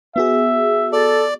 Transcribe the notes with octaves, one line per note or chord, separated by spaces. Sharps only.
B3 F#4 G#4 E5
A4 D5